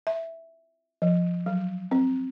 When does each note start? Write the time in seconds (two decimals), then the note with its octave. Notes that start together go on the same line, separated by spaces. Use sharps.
0.07 E5
1.02 F3
1.46 F#3
1.91 C4